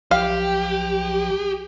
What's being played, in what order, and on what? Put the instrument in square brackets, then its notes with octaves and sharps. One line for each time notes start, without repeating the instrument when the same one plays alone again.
[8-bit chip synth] B1 F3 G5 [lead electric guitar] G4 [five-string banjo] F5